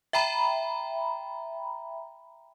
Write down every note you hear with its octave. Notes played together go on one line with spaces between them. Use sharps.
E5 G5 A#5 B5